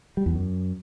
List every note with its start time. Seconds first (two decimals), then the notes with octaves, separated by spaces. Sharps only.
0.17 G3
0.26 E2
0.35 F#2